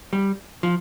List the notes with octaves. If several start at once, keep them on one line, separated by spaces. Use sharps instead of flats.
G3
F3